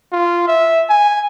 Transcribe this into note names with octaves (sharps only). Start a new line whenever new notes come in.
F4
E5
G#5